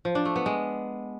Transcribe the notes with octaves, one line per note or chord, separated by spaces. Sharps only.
F3
D4
A3
B3
G#3